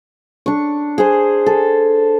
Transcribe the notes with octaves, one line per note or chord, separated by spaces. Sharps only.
D4 C#6
G#4 C5
A4